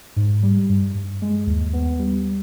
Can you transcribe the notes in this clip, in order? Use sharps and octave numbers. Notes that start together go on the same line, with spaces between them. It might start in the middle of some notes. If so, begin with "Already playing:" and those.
G#2
G3
G2
G2
G#3
D#2
B3
G3